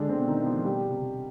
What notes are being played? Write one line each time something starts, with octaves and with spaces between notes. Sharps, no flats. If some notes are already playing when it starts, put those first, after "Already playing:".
Already playing: D3 G#3 D4
C4
B2
D#3 D#4
B2
F3 F4
G3 G4
C3